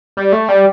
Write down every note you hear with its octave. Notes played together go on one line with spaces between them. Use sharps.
G3
A3
G3